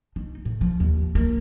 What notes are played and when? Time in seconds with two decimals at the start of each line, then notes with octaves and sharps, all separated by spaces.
0.16 D#4
0.45 A2
0.61 F3
0.80 D#2
1.15 A#3